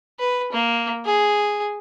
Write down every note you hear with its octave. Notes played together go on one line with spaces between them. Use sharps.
B4
A#3
G#4